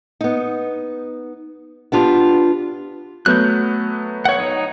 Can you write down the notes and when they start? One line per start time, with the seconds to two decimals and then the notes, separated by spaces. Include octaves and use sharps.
0.21 B3 D#4
1.92 B3 D4 F4 G4
3.26 F#3 A3 B3 F#6 G6
4.25 C#5 F#5
4.39 D#4 C#5